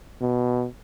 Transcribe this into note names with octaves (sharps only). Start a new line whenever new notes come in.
B2